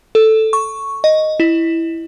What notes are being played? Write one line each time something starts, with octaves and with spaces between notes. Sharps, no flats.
A4
C#6
D#5
E4